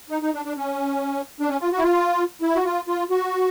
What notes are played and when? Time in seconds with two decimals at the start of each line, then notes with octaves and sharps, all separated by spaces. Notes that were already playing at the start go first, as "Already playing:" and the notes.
0.10 D#4
0.23 D#4
0.34 D4
0.45 D4
0.57 C#4
1.40 D4
1.49 C#4
1.61 F4
1.72 F#4
1.78 E4
1.83 F4
2.41 E4
2.56 F#4
2.65 F4
2.88 F4
3.10 F#4